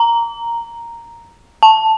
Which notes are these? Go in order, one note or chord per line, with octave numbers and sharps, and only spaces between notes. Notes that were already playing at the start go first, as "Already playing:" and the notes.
Already playing: A#5
A5